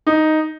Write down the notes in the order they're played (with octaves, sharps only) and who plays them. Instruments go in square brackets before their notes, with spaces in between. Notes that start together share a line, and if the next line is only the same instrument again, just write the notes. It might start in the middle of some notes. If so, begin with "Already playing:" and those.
[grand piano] D#4